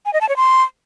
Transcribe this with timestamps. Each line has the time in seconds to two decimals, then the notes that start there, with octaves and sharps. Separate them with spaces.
0.06 G#5
0.13 D#5
0.21 A5
0.29 C#5
0.37 C6